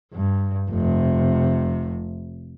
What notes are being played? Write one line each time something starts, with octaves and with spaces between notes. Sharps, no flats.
G2
F1 C3